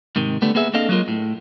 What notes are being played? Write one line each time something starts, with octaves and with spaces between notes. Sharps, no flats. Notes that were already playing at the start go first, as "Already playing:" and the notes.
G#2 C3 D#3
D3 G3 A3 B3
A#3 B3 G#4 E5
A#3 C4 D4 A4 D#5 F5
F#3 G#3 A#3 F4 A#4
A2